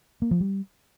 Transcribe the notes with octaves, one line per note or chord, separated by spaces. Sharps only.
A#3
F3
G3